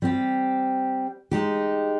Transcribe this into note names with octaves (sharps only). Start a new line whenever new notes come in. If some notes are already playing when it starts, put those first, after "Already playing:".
G3 C4 G4
G#3 D#4 G4